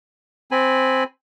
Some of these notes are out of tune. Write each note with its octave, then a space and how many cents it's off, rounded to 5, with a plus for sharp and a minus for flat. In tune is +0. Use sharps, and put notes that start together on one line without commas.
C4 +0 G#5 +0 B5 +0